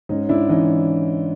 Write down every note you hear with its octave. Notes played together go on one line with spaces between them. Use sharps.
G#2 C#4 D#4
G#2 D4 E4
E3 C#4 D#4